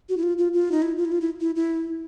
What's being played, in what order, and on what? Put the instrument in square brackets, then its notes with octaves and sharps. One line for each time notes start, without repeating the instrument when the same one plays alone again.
[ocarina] F#4
E4
F4
F4
F4
D#4
E4
F4
E4
F4
E4
E4
E4